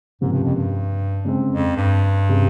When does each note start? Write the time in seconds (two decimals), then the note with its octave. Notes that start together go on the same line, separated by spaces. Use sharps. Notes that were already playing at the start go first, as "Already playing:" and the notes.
0.21 C#2 G#2 C3 F3 A#3 C#4
0.32 G2
0.44 F2
0.55 G2
1.25 C#3 G#3 C4
1.50 F2
1.77 G2
2.29 C3 G3 C#4 G#4